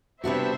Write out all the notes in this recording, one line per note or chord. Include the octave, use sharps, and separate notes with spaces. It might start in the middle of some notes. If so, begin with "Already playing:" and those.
C3 G3 B3 D4 F#4 C5 E5